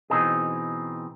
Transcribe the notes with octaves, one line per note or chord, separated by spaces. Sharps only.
B2 E3 C4 D#4 G#4